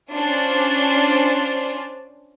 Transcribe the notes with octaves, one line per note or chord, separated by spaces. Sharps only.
C#4 D4 F4 C5 D5